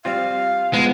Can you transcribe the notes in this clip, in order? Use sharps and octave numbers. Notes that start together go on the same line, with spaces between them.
G3 C4 F4 F5
F3 G#3 B3